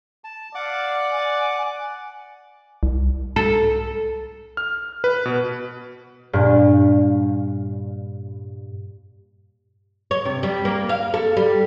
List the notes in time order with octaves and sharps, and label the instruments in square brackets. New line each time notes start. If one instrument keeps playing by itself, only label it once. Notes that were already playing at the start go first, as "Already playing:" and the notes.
[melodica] A5
[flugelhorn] D5 [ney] F5 [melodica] F#5 D6
[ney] G#5
[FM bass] C2
[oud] A4
[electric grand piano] F6
B4
B2
[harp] G2 A#2
[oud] C#5
C3
G3
A#3
F5
A4
G3